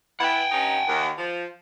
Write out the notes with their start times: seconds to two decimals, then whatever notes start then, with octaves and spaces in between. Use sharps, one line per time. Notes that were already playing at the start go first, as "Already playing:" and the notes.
0.20 B3 E4 F#5 G5
0.52 G2 C#4 D#4
0.88 D#2
1.17 F3